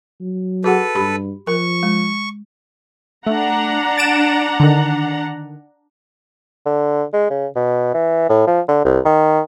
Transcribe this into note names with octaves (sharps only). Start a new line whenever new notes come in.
F#3
F#4 G#4 A4 B4 F#5
G2 G4 B5
F3 A#4 C#6
G#3
A3 D4 F#5 A#5
A6 D7 E7
D3 D#3
D3
G#3
C#3
B2
E3
A2
F3
D3
C2
D#3